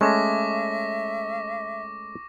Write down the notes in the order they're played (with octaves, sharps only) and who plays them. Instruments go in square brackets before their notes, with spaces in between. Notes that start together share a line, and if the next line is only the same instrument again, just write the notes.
[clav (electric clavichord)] G#3 A3 C#4 [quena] E5 [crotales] C#6 D6 A#6